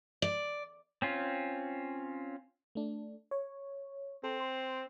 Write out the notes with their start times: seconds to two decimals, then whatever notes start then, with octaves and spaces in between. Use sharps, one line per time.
0.22 D5
1.02 C4 C#4 F4
2.75 A3 D4
3.31 C#5
4.24 C4 A4
4.40 C6